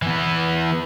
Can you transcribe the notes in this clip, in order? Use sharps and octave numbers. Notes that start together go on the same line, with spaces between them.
E3 B3